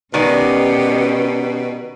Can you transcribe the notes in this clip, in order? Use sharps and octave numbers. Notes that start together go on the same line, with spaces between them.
B2 D#3 G#3 C#4 G4 D5